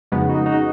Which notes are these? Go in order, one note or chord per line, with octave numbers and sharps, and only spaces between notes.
F2 C#3 G#3 B3 D#4 F#4
D#4 F#4
D#4 F#4